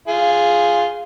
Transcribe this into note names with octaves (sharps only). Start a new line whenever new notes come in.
F4 G#4